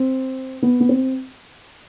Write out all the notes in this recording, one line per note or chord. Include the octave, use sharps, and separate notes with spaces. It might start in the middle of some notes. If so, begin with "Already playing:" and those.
Already playing: C4
B3
B3
C4